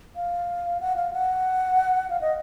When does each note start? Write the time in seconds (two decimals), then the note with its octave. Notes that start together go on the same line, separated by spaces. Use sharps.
0.16 F5
0.81 F#5
0.96 F5
1.13 F#5
2.10 F5
2.21 D#5